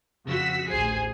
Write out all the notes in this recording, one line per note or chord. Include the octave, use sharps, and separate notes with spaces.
F2 C#3 F#4 E6 B6
A1 D2 G#4 C5 G#5 C7